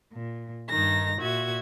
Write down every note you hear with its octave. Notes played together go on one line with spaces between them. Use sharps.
A#2
G2 D#3 D#4 A#6
A#2 F#4 E5 G#6